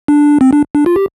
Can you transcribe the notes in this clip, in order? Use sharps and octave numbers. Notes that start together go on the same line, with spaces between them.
D4
C4
D4
D4
F4
G4